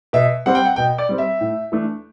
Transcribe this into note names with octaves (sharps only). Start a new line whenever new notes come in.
B2 E5
G3 C4 F#5
G5
F#5
B2 G5
D5
G3 C4
E5
A2
E3 A3 D4